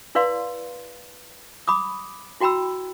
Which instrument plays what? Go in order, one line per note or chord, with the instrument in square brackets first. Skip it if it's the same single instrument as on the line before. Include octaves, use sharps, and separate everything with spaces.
[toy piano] E4 B4 D5 F5 C6
B5 D6 D#6
E4 F#4 G5 A#5 B5 E6